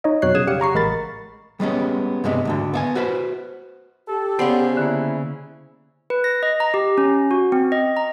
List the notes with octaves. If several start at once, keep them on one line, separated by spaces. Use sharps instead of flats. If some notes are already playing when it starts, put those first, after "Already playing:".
D#4 C#5 D#5
F2 B2 F#3 C#5 F#6 C7
C#3 D#6 G#6 E7
G3 G4 F5 F#5 C#7
F#5 A#5 C#6 C7
A1 G#3 A#4 B5 A6
G3 G#3 B3 C#4
G2 C3 G#3 B3
D2 G#2 D3
B3 E5 G#5
F#4 B4 C5
G4 A4
C#3 B3 C5 D5 F#5
D3 A#3 E4
B4
A#6
D#5
A#5
G4
C#4
F#4
C4
D#5
A#5